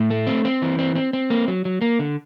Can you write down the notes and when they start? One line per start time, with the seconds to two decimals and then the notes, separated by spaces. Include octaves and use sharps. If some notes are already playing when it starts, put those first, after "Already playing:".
Already playing: A2
0.10 A3
0.27 C4
0.45 C4
0.62 E3
0.79 C4
0.95 C4
1.13 C4
1.30 A#3
1.48 F#3
1.65 F#3
1.81 A#3
1.99 D3